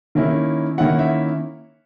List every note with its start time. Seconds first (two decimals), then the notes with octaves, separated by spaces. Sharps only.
0.15 D#3 A#3 C#4 E4
0.78 D#3 A#3 C#4 E4 F#5
0.99 E5